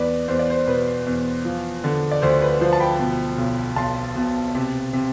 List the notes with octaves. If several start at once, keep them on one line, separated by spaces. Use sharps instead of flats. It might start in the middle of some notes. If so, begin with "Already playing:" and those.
Already playing: E2 B4 D5
E2 C5
D5
C5
B2 B4
E2
F3
D3
D5
D2 C5
B4
F3 C5
A5
G5 B5
B2
B1
B1 A5 C6
B2
C3
C3